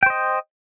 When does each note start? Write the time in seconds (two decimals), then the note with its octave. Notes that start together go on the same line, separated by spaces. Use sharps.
0.03 G5
0.06 C5
0.10 D#5